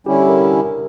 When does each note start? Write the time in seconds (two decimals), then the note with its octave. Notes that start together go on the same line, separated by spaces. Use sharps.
0.06 D3 G3 C#4 E4 G4
0.29 A#4